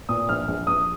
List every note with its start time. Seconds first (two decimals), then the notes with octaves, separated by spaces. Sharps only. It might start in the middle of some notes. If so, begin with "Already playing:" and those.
0.09 A#2 D#6
0.29 A#1 F6
0.48 A#1
0.67 A#1 D#6